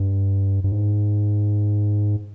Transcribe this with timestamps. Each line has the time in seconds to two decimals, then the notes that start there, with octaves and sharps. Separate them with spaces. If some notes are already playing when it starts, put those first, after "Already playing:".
Already playing: G2
0.64 G2
0.72 G#2